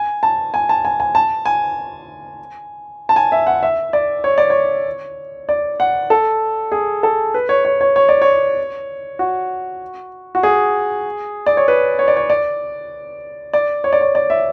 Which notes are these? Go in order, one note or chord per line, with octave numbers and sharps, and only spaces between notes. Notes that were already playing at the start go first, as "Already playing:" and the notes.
Already playing: G#5
A5
G#5
A5
G#5
G#5
A5
G#5
A5
G#5
E5
F#5
E5
D5
C#5
D5
C#5
D5
F#5
A4
G#4
A4
B4
C#5
C#5
C#5
C#5
D5
C#5
F#4
F#4
G#4
D5
C#5
B4
C#5
D5
C#5
D5
D5
C#5
D5
C#5
D5
E5